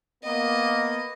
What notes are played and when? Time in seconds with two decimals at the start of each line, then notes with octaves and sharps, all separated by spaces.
0.23 A#3 B3 D#5